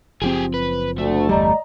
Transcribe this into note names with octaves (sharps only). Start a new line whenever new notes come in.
F#1 F3 C4 G4 G#4
B4
D2 A3
G1 E2 G3 D5 D#5 A#5